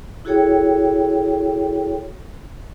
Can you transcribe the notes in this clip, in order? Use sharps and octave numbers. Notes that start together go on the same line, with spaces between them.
E4 F#4 G#4 A4 C#5 G5